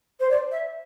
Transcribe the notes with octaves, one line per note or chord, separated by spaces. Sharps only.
C5
D5
E5